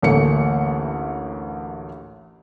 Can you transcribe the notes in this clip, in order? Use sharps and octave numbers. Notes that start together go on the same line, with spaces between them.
A1 D2 A3 A#3 C#7